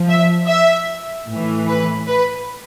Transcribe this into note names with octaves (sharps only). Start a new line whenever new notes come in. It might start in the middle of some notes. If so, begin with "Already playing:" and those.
Already playing: F3
E5
E5
A2 E3
B4
B4